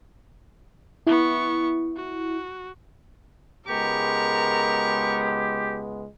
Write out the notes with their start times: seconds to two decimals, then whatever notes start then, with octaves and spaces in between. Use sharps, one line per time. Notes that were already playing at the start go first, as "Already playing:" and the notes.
1.07 B3 E4 C#6
1.96 F#4
3.67 C#2 G#3 B3 G4 A#4 C#6